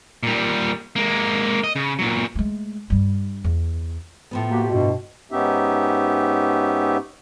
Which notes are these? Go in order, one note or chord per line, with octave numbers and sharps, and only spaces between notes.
A#2 G3
G#3 A#3
D#5
C#3
A#2 F#3
G#3 A3
G2 G3
E2
A2 F3 B3
A#3 F#4 G4
G2 B2
G#2 B3 C#4 D#4 G4 E5